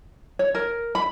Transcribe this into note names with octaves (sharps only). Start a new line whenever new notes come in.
C#5
A#4
B5